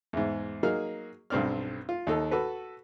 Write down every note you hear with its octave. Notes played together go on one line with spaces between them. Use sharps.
E2 G#2
F#3 A#3 D#4 G#4 F6
B1 G2 C4 D5 F6
F4
D#2 D#4 A4
F#4 A4 B4